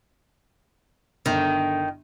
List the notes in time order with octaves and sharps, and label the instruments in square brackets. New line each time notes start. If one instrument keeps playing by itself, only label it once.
[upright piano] G1 D3 D4 [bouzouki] D#3